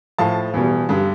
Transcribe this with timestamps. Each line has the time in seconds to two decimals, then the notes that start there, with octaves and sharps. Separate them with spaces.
0.18 A2 F3 F5 A5
0.54 E2 B2 G3
0.89 G2 D3 G3